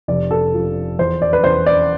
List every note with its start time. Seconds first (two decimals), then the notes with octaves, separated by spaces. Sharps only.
0.08 F1 D5
0.31 A4
0.54 F3
0.99 E2 C5
1.22 D5
1.33 B4
1.44 E2 C5
1.66 D5